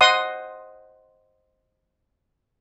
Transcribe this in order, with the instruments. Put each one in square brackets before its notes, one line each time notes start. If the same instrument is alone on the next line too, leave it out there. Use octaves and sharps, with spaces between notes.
[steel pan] C5 D#5 F#5 C6 D#6